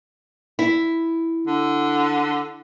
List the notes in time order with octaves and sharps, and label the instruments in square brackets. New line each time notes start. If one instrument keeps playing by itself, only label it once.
[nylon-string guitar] E4
[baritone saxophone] D3